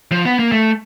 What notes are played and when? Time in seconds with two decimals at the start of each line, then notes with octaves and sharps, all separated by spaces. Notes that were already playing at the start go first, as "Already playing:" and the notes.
0.12 F3
0.25 B3
0.39 A#3
0.52 A3